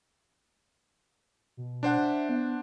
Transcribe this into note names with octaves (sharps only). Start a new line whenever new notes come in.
B2
D4 C5 F#5
E5
B3